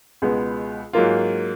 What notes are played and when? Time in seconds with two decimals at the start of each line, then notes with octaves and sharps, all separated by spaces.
0.22 C#2 B2 G#3 B3
0.93 G#2 F#3 A#3 F4